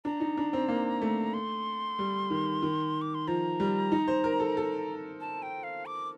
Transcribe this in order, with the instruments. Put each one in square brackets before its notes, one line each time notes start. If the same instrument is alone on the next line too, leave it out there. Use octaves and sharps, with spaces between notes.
[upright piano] D4 [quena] A#5
[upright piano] D#4
D4
C4
A#3
A3
[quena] C6
[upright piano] G3
D#3
D#3
[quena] D6
C6
[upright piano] F3 [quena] A#5
[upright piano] G3
D#4
C5
A#4
A4
A4
[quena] A5
G5
F5
D6